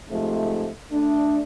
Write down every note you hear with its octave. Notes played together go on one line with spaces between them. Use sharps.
G#2 C3 F3 A3
A3 D4